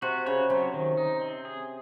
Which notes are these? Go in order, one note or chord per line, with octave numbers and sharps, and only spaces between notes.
C3 F#4
C#3 C#5
C3 F#3
D#3
D#4
C4
G#4